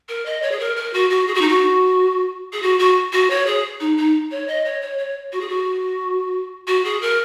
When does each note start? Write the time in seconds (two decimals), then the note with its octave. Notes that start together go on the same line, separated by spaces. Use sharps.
0.08 A#4
0.25 D#5
0.42 C#5
0.51 G#4
0.59 A#4
0.76 A#4
0.93 F#4
1.10 F#4
1.27 G#4
1.34 F#4
1.41 D#4
1.48 F#4
2.52 G#4
2.62 F#4
2.79 F#4
3.12 F#4
3.30 C#5
3.46 G#4
3.80 D#4
3.97 D#4
4.31 C#5
4.47 D#5
4.65 C#5
4.81 C#5
4.98 C#5
5.32 F#4
5.40 G#4
5.49 F#4
6.67 F#4
6.84 G#4
7.01 A#4